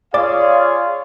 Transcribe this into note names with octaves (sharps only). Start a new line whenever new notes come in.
F4 G#4 C#5 D5 F5 D6